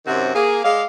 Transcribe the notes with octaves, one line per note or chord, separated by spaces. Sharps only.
F#2 C3 D#3 C4 F#4
A#3 G#4
G#3 D5 F5